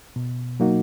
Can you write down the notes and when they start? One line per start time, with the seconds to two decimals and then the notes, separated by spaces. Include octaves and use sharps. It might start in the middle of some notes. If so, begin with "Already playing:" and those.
0.16 B2
0.60 F#3 A#3 D#4 F#4